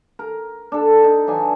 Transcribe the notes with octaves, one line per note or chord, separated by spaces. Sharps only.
A#4
D4 A4
D#4
E3 F#3 D4 G#5